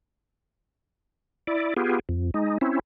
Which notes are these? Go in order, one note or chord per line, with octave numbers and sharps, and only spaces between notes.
E4 D5
B3 F4 G4 G#4
F2
G#3 D#4
C4 C#4 E4